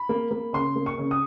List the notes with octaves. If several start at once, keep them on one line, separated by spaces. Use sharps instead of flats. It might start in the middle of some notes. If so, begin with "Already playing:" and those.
Already playing: B5
A#3
A#3
C#3 C6
A#3
C#6
C#3
D#6